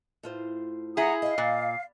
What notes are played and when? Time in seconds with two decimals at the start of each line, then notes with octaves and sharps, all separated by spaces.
0.23 A2 F4 C5
0.97 E4 G#4 F#5 A#5 D#6
1.22 D#5 F5 G5
1.38 A#2